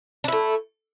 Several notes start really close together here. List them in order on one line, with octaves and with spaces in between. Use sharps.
D4 E4 A3